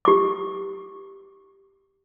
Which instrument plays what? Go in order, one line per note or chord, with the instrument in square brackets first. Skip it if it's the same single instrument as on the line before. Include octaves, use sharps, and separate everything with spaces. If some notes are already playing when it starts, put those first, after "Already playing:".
[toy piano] G4 D6